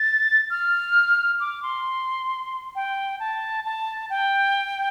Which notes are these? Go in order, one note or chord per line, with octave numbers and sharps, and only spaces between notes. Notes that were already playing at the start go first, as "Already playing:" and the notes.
Already playing: A6
F6
D6
C6
G5
A5
A5
G5